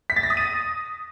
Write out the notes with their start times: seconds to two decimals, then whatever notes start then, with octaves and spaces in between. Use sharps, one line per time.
0.10 B6
0.16 A6
0.23 A#6
0.30 D#6
0.37 D#7